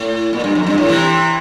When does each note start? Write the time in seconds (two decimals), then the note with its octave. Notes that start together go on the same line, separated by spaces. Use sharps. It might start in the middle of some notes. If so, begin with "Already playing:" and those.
Already playing: A2
0.33 A#2
0.44 G2
0.55 F2
0.67 G2
0.78 A2
0.88 C3 E3